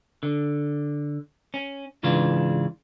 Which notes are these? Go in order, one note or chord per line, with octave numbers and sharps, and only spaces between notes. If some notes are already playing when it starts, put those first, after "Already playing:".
D3
C#4
G#2 C#3 E3 D4 F4